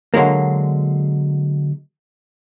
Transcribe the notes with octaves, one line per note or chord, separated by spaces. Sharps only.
D3 F#3 G#3 A#3